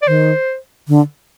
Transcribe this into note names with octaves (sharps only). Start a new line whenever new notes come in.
D5
D#3 C5
D3